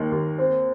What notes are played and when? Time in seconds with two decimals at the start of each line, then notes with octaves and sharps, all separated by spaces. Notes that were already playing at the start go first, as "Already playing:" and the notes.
Already playing: D#2 D#3 A#3
0.12 D#2
0.38 C4